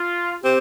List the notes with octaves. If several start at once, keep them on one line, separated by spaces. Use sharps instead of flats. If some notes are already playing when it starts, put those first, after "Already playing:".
Already playing: F4
C4 G4